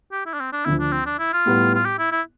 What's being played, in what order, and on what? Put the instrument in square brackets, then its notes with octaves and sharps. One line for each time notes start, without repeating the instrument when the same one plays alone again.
[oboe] G4
E4
D4
C4
D4
[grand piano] D2 D3 F3 [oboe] E4
[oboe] D4
C4
D4
E4
F4
[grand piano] A2 G3 B3
[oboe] F4
G4
E4
E4